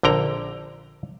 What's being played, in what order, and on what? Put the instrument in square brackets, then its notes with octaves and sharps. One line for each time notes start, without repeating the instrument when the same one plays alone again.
[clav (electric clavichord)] A#1 D3 G5 A#5